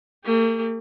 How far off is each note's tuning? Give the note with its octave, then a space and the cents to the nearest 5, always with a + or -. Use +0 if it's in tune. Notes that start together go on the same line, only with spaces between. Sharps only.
A#3 -45 G4 +45